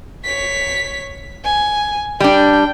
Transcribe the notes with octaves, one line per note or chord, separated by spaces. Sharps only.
C#5 B6
G#5
G3 D4 G5